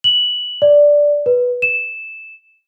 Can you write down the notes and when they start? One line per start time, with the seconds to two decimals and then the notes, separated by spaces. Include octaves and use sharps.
0.04 F#7
0.62 D5
1.26 B4
1.62 E7